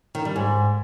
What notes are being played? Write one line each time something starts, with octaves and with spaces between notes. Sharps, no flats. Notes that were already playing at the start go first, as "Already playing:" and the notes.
D#3
G3
G#2